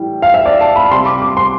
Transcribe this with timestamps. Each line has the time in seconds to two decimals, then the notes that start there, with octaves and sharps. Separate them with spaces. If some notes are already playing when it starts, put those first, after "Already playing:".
Already playing: A2 E3 G3
0.22 F5
0.34 E5
0.46 D5
0.61 A5
0.76 B5
0.91 C3 G3 C6
1.06 D6
1.22 D6
1.37 C6